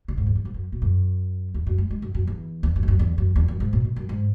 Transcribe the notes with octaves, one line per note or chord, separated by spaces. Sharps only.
C#3
G#2
E2
F#2
G#2
F#2
B2
F#2
E2
F#2
G#3
G#3
F#2
F#2
E2
E2
F#2
E2
F#2
E2
F#2
E2
F#2
G#2
B2
B2
F#2
G#2